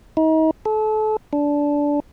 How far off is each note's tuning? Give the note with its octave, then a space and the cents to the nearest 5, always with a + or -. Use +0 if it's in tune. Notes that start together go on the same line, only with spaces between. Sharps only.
D#4 +35
A4 -30
D4 -15